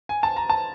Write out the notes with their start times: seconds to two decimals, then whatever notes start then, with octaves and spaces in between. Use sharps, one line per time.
0.09 G#5
0.23 A5
0.36 A#5
0.50 A5